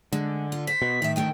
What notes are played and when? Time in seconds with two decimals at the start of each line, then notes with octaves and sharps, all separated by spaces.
0.13 D3 G#3
0.52 F4
0.67 C5 B6
0.82 B2
1.02 A2 D#3 E5
1.16 D2 A3 E4 G5